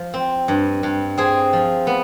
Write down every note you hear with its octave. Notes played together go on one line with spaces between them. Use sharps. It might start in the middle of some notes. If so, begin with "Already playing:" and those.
Already playing: F3
C4
G2
G2
C4 G#4
F3
B3